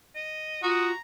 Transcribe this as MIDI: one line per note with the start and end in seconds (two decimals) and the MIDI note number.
0.15 0.62 75
0.63 0.92 65
0.63 0.90 66
0.63 1.00 82
0.63 0.87 87